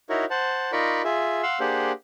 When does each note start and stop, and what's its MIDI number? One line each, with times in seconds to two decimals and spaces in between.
0.10 0.25 63
0.10 0.25 64
0.10 0.25 66
0.10 0.25 70
0.10 0.25 73
0.30 0.71 72
0.30 0.71 78
0.30 0.71 81
0.72 1.02 63
0.72 1.02 65
0.72 1.02 70
0.72 1.02 74
0.72 1.02 83
0.72 1.02 85
1.04 1.42 65
1.04 1.42 68
1.04 1.42 76
1.43 1.59 77
1.43 1.59 78
1.43 1.59 84
1.43 1.59 88
1.60 1.92 58
1.60 1.92 62
1.60 1.92 67
1.60 1.92 68
1.60 1.92 72
1.60 1.92 78